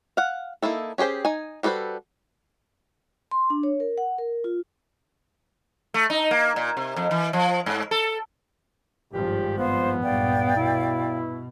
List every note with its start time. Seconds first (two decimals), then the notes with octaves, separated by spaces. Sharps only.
0.17 F5 F#5
0.62 A#3 D#4 E4 A4
0.98 C#4 G4 G#4 C5 G5
1.25 D#4 G#5
1.63 G3 F#4 A4 B4 C5
3.31 C6
3.50 D4
3.63 C#5
3.80 A#4
3.98 F#5
4.18 A#4
4.44 F4
5.94 A3
6.10 D#4
6.31 A#3
6.56 A#2
6.77 C3
6.96 F2
7.11 E3
7.33 F3
7.66 G#2
7.91 A4
9.13 G#1 G2 F3 G4
9.58 B3 C5 F5
10.03 B1 G2 A#2 D5 F5 G5
10.56 B2 E4